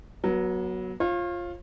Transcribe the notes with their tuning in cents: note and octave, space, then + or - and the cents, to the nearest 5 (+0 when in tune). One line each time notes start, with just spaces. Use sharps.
F#3 +0 B3 -35
F4 +0 C#5 -45